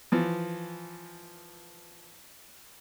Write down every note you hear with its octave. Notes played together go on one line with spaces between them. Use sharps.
E3 F3